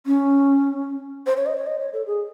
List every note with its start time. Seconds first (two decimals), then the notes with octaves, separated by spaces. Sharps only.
0.06 C#4
1.26 C5
1.37 C#5
1.46 D#5
1.57 C#5
1.66 D#5
1.80 C#5
1.93 A4
2.07 G#4